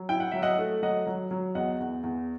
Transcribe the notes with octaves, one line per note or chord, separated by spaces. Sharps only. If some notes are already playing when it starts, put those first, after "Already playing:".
Already playing: F#3
E4 G5
F#5
F#3 E5
D#5 F#5
A3
F#3 D#5 F#5
F#3
F#3
E2 D#5 F#5
E2
E2